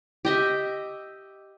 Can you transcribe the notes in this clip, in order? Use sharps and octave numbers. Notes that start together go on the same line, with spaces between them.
G4 D#5 E5